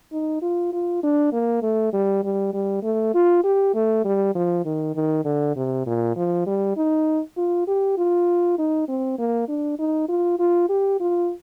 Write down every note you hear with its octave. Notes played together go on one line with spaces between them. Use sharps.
D#4
F4
F4
D4
A#3
A3
G3
G3
G3
A3
F4
G4
A3
G3
F3
D#3
D#3
D3
C3
A#2
F3
G3
D#4
F4
G4
F4
D#4
C4
A#3
D4
D#4
F4
F4
G4
F4